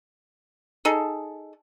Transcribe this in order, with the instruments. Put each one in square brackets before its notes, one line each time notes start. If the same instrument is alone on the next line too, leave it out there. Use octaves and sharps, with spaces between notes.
[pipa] D#4 G#4 A4